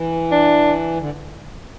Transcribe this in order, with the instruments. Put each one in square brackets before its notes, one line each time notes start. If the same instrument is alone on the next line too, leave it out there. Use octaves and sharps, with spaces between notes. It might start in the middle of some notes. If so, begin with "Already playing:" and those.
Already playing: [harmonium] E3
[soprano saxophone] D4
[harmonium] D3